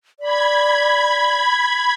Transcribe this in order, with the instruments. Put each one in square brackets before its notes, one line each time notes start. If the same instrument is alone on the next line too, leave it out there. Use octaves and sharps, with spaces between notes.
[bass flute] D5 [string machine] B5 G#6